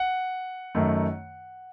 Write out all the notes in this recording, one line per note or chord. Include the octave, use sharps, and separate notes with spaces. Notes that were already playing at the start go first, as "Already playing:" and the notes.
Already playing: F#5
F#2 D#3 A3